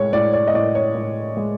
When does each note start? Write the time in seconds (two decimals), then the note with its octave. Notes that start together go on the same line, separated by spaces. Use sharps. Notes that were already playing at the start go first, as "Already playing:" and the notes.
Already playing: A2 G#3 C#5
0.13 A2 D5
0.33 D5
0.47 D#5
0.54 A2 D5
0.75 C#5
0.95 A2
1.37 G#3